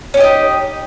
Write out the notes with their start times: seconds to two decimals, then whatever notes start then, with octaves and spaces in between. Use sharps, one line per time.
0.14 C#4
0.17 G4
0.20 D#5
0.24 D#4